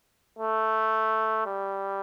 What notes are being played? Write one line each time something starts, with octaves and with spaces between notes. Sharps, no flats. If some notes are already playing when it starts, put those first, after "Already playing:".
A3
G3